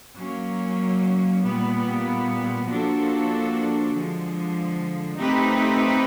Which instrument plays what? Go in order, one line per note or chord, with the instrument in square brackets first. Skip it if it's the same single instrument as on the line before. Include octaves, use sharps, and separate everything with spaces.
[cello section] F#3 A#3 C#4
A#2 G3 B3
F3 A#3 D4 F#4 A4
D3 F3 G#3
A3 C4 D#4 G4 B4